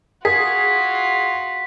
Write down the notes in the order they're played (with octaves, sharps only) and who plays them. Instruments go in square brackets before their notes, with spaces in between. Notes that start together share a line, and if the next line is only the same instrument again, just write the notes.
[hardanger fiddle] F4 F#4 [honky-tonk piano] G#4 [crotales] B6